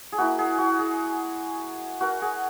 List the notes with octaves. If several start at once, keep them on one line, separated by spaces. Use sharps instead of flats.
G#4
A#3 E4 F#4
G#4
F#4
G#4
F#4 A#4
G#4